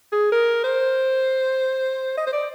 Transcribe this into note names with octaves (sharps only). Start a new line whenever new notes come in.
G#4
A#4
C5
D#5
C5
D5